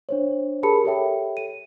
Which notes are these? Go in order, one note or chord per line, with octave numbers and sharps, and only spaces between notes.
D4 C5 C#5
G4 G#4 A#4 A5 B5 C#7
G4 A4 C#5 E5 G5
D#7